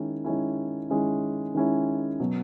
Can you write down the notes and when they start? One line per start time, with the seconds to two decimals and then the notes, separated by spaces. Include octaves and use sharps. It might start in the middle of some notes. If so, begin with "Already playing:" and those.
Already playing: D#3 G#3 C#4 E4
0.24 D#3 G#3 C#4 E4
0.89 D#3 G#3 C#4 E4
1.55 D#3 G#3 C#4 E4
2.20 B2 F#3